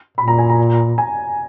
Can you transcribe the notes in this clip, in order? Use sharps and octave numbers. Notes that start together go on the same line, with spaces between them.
A#2 B5
A#5
G#5
A#5
G#5